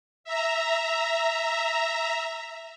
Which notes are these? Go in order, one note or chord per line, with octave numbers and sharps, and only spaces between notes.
E5 A#5